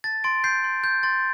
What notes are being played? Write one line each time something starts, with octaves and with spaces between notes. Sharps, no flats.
A5 A6
C6 A6 D7
G6 C7
C6
G6
C6 A6